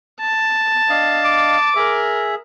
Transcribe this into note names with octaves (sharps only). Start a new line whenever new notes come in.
A5
D4 D#5 F5
D6
G#4 A#4 E5